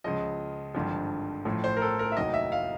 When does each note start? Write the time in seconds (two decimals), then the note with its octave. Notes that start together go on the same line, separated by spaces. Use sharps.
0.04 C#2 C#3 F3 D#5
0.74 G#1 G2 D3 F3
1.45 A1 A2 F3
1.64 C5
1.77 A#4
1.82 A4
1.99 A#4
2.12 E5
2.16 F1 D#2 D#3 F#3 D#5
2.34 E5
2.52 F5